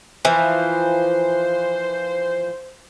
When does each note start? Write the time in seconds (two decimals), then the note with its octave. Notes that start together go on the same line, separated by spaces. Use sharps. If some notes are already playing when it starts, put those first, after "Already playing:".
0.25 E3 F3 C5